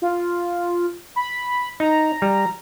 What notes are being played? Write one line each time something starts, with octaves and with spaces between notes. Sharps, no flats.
F4
B5
D#4 A#5
G3